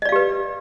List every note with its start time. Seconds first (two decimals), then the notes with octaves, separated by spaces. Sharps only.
0.02 D#5
0.05 D5
0.09 F5
0.12 G4
0.16 B4